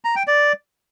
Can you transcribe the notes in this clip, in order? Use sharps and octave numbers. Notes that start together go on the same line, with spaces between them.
A#5
G5
D5